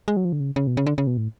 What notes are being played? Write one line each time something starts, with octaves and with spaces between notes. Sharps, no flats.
G#3
F#3
F3
D3
C#3
C#3
B2
C#3
D3
C#3
B2
A2